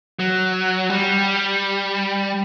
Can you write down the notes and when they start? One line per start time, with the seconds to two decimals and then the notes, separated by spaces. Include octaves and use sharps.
0.19 F#3
0.90 G3